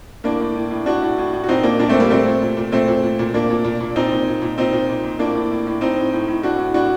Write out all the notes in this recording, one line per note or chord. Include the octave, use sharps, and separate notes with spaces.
A2 A#3 D4
A2
A2
A2
A2 D4 F#4
A2
A2
A2
F#4
A#2 C4 D#4
A#2 A#3 D4
A#2 A#3 D4
A3 C4
A#2 G3 A#3
A#2 A3 C4
A#2
A#2
A#2
A#2 A3 C4
A#2
A#2
A#2
A#2 A#3 D4
A#2
A#2
A#2
A#2 C4 D#4
A#2
A#2
A#2
A#2 C4 D#4
A#2
A#2
A#2
A2 A#3 D4
A2
A2
A2
A2 C4 D#4
A2
A2
A2
A2 D4 F#4
A2
A2 D4 F#4